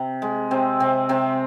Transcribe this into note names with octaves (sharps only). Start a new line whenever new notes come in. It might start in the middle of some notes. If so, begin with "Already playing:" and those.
Already playing: C3
G#3
C3 C4
C3 C4
C3 C4